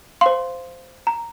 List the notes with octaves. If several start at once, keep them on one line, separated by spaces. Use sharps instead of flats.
C5 F5 C6
A#5